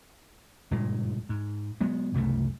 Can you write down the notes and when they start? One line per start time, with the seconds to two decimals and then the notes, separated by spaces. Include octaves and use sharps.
0.71 F#1 G2 A#2 G#3
1.29 G#2
1.81 F#3 G#3 B3
2.14 C2 F#2 C#3 A3